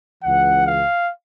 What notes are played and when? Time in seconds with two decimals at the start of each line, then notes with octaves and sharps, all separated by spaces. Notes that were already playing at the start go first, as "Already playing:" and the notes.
0.24 C#2 C#3 E3 F#5
0.66 F5